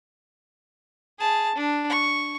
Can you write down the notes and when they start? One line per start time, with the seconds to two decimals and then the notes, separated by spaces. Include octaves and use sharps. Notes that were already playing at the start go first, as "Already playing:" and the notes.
1.19 G#4 A5
1.55 D4
1.90 C#6